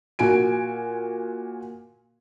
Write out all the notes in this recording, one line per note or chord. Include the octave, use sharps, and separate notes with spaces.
A#2 F#4 G#5 D7